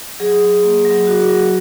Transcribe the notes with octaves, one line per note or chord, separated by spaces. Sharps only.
F#3 G#4
F#3
A#3
F#3
F#4
F#3